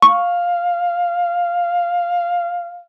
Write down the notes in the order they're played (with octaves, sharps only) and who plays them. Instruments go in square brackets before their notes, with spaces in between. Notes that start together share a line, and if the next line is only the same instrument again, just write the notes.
[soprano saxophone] F5 [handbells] C#6